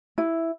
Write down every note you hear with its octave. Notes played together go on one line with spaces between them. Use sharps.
E4